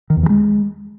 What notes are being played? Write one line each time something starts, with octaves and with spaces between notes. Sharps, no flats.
D#3
E2
E3
G#3